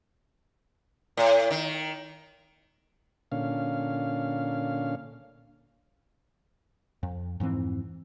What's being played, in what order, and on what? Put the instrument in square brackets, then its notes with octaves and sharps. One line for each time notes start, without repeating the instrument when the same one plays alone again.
[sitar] A2
D#3
[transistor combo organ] A#2 D3 C#4 F5
[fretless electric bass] F2
F2 G#2 E3 C4